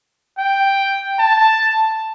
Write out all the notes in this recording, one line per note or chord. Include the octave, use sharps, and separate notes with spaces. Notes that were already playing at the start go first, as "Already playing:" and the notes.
G5
A5